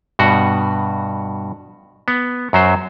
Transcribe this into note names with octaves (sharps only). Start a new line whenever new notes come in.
G2 B2 F#4
B3
F#2 F#3 C5